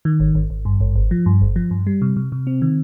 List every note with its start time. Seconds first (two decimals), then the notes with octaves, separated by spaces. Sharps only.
0.05 D#3
0.20 G#1
0.35 G#1
0.50 G#1
0.65 G2
0.81 G#1
0.96 G1
1.11 F3
1.26 G2
1.41 G1
1.56 F3
1.71 G2
1.87 G3
2.02 C3
2.17 C3
2.32 C3
2.47 C4
2.62 D#3